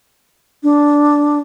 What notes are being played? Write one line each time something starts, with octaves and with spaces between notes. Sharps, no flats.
D4